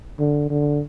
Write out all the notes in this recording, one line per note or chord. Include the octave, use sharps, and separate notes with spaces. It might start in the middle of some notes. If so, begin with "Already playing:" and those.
D3
D3